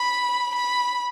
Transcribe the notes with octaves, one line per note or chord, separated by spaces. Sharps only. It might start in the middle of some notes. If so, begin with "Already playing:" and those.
Already playing: B5
B5